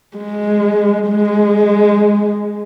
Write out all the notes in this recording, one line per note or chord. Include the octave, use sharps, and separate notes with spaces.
G#3
G#3